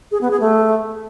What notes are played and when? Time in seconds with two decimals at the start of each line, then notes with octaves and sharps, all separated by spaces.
0.12 G#4
0.21 B3
0.31 G#4
0.40 A3